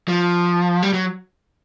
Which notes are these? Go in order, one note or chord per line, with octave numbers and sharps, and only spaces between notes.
F3
G3
F#3